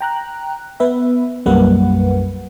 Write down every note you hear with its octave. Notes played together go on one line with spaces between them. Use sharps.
G5 A#5 F#6
B3 B4 E5
B1 F#2 G3 A#3 B4 F#5